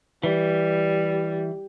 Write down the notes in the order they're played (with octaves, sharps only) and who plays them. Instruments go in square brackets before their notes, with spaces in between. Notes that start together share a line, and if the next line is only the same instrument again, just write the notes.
[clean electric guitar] E3 [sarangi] G3